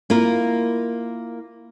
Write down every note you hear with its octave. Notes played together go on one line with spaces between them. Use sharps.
A#3 E4 F4 A#4